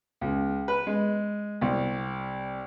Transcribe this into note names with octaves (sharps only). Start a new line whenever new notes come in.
C#2
B4
G#3
C2